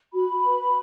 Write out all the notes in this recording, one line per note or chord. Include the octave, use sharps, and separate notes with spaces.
F#4 B5
B4